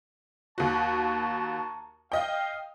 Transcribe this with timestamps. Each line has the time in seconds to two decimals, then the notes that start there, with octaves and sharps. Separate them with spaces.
0.58 D#2 F#4 A5 A#5 C#6
2.12 D#5 F5 G5